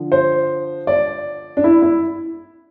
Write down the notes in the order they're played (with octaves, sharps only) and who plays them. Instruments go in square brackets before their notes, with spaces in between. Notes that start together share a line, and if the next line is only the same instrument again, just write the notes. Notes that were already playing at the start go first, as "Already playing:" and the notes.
Already playing: [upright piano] D3 F3
C5
D5
D4
E4
E4